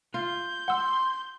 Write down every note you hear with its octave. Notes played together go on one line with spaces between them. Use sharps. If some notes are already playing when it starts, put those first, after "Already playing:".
F4 G6
F#5 C6 E6